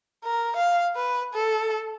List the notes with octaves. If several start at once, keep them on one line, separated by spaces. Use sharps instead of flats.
A#4
F5
B4
A4